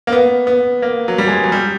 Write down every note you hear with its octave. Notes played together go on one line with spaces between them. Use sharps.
A#3
B3
B3
A#3
F#3
G3
G#3
F#3
G3